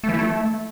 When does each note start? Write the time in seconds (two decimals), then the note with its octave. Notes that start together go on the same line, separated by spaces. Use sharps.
0.04 A3
0.09 E3
0.14 E4
0.19 A3